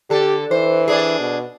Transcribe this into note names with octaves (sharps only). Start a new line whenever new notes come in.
D3 G4 A4
E3 C5
D4 G#4
B2